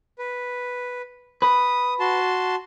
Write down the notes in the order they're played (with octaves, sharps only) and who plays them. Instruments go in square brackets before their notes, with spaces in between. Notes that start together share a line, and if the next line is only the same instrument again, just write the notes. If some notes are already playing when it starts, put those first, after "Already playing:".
[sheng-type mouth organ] B4
[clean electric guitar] B4 [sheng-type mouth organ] D#6
[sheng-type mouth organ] F#4 A5 C6